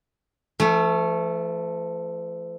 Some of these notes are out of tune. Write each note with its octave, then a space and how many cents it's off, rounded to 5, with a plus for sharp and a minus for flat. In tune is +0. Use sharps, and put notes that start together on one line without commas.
F3 -40 A3 +0